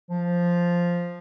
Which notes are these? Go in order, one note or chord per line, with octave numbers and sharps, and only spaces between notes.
F3